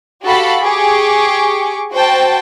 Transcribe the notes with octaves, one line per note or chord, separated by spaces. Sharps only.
F#4 G4 A4 F5 A5 B5
G4 G#4 C#6 D6
F#4 C5 G5 A5